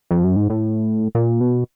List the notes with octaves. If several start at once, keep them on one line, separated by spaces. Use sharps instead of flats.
F2
F#2
G#2
A2
A#2
B2